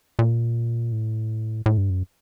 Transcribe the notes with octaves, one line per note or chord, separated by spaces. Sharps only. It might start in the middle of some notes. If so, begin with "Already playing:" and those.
A#2
A2
A2
G2
F#2